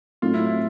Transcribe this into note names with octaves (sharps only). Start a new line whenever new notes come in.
A2 F#3 A3 C4 D#4 F4
E4
E4